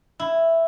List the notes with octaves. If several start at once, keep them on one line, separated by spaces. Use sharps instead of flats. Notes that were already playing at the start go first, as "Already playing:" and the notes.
E4